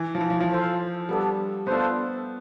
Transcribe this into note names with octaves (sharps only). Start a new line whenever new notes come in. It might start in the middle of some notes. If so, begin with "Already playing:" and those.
Already playing: E3
F3
E3
F3
F3
F4 A4 C5 F5
G3 B3 D4 A4
A3 B3 D4 F4 A4 C5